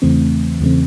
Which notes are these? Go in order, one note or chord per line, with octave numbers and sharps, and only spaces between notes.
E2 C#3 E3 A3 C4
E2 C#3 E3 A3 C4